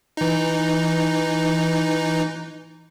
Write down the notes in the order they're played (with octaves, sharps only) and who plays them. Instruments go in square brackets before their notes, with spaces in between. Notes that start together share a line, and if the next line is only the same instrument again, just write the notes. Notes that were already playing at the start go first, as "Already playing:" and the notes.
[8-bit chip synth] E3 D#4